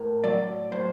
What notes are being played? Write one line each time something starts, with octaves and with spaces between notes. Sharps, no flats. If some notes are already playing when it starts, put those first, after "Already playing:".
Already playing: A2 A#4
F#3 D5
A2 C5